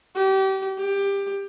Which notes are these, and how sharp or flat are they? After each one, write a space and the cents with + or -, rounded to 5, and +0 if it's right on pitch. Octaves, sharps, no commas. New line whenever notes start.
G4 -30
G4 +20